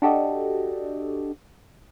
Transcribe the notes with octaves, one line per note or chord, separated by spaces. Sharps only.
D4 F#4 G4 A4 D5 D#5